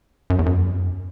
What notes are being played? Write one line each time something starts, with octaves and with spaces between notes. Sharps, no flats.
F#2
E2
F#2